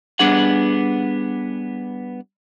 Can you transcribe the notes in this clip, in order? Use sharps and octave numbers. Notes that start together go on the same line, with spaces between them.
G3 B3 D4 G#4 F#5